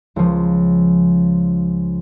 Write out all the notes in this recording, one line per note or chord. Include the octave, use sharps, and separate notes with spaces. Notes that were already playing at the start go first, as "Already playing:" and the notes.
C#2 F3